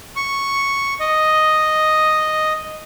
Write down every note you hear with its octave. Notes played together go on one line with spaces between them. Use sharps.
C#6
D#5